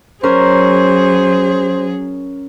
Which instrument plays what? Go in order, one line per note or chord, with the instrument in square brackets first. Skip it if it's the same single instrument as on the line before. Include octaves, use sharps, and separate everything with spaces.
[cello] F#3 G#4 [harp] C#4 A#4 [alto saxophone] C5